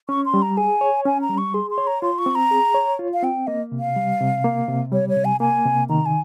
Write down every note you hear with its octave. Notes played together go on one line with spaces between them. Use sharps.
C#4 C#6
C6
G3
A#5
G#4 G#5
C#5
C#4 G#5
A#5
G3
C#6
G#4 C6
C6
C#5
A#5
F4 C6
C#6
C4
A#5
G#4
C#5
F4
F5
C4 G5
A#3 D#5
C3
F5
G3
C3
A#3
C3
G3 C#5
C#5
C3
G#5
A#3 G#5
C3
D#3 A#5
G#5